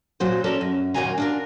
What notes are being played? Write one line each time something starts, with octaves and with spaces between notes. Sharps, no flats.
A#2 F#3 F#4 C5
C#4 A4 A#4 D5
F#2
D#2 A#2 D#3 F#3 G#5 A#5
D4 F4 A#4